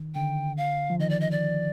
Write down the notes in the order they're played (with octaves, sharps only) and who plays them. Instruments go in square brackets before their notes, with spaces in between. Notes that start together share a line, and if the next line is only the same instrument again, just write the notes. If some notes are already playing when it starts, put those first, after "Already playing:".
Already playing: [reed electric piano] D#3
[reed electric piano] D3 [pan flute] G5
[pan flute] F5
[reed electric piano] F3
[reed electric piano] D#3 [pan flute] D#5
[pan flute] D5
D#5
D5